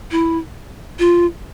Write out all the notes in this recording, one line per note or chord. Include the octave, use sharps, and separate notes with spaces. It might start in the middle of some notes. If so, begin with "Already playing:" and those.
E4
F4